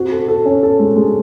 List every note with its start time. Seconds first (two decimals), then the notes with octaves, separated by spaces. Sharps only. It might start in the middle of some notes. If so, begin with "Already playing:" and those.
Already playing: C4 F#4
0.11 A4
0.28 A4
0.46 C#4
0.63 A4
0.79 G#3
0.96 G#3